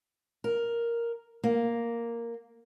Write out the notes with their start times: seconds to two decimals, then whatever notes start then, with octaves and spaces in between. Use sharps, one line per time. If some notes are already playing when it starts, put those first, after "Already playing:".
0.44 A#4
1.44 A#3